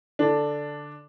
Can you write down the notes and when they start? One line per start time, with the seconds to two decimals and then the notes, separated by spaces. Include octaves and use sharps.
0.19 D3 D4